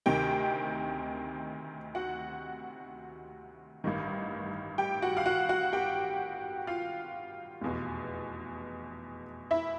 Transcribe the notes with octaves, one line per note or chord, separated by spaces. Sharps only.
D2 C3 D#3 G4 G5
F#4 F#5
A1 G2 D#3
G4 G5
F#4 F#5
F5
F#4 F#5
F#4 F#5
G4 G5
F4 F5
F1 E2 B2
E4 E5